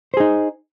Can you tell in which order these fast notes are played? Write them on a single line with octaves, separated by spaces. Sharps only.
C5 G#4 D#4